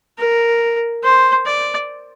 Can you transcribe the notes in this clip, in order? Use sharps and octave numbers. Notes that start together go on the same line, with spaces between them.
A#4
C5
D5